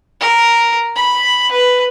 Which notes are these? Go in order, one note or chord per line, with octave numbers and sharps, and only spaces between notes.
A#4
B5
B4